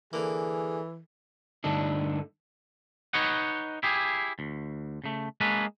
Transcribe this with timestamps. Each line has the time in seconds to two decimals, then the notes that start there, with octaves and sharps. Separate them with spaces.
0.13 D3 E3 A#3 G#4
1.64 G2 D3 A3 D4 D#4
3.13 D#4 B4 C#5 D#5 F#5
3.83 E4 G4 G#4
4.39 D2
5.04 C#3 A3
5.40 G#3 A#3 C#4 A4 B4